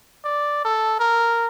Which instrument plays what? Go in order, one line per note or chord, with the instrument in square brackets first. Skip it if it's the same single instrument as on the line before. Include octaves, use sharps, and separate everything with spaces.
[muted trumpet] D5
A4
A#4